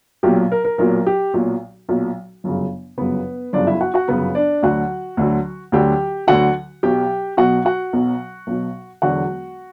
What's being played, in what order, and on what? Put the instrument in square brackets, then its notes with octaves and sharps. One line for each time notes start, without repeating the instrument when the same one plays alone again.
[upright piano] B1 A#2 F#3 G4
A#4
A#4
B1 A#2 F#3 A#4
G4
B1 A#2 F#3
B1 A#2 F#3
G1 F#2 C#3
G1 F#2 C#3 B3 B4
G1 F#2 C#3 D4 D5
E4 E5
F#4 F#5
F#4 F#5
G1 F#2 C#3 B3 B4
D4 D5
D2 D3 F#3 F#4 F#5
D2 D3 F#3
D2 D3 F#3 G4 G5
D2 D3 F#3 F#4 F#5
B1 B2 F#3 G4 G5
B1 B2 F#3 F#4 F#5
F#4 F#5
B1 B2 F#3
B1 B2 F#3
E1 E2 D3 F#3 F#4 F#5